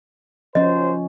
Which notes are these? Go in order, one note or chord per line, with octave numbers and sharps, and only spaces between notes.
D#2 F3 F#3 C#4 C5 D#5